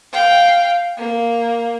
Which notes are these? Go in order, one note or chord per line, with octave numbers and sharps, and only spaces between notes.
F5 G5
A#3